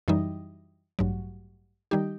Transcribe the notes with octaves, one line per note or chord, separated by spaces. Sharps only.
F#2 E3 G3 D#4
A1 G2 F#3
D#3 G3 D#4 G4